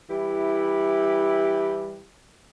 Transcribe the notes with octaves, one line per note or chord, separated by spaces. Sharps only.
E3 G3 E4 G4